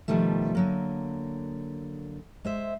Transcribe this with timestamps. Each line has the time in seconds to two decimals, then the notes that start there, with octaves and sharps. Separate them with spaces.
0.08 B2 D3 D#3 F3 G3 A3
0.55 D3 F#3 A#3
2.45 G#3 C5 E5